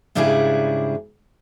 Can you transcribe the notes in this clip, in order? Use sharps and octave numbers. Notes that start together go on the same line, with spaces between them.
G#2 C#3 G3 D4 E4 G#4